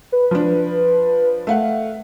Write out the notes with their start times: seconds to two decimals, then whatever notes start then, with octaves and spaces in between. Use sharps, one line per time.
0.12 B4
0.31 F3 D4
1.47 A3 F5 F#5